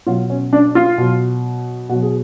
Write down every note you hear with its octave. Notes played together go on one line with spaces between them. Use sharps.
B2 F#3 F4
C#4
D4
F4
B2 F#3
B2 F#3 F#4
G#4